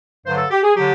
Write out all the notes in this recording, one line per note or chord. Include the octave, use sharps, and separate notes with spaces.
G2 D3 F#3 C5
A4
G4
G#4
D3 F#3 G4